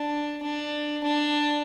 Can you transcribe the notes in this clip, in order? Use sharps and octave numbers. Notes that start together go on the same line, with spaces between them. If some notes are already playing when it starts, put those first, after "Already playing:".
Already playing: D4
D4
D4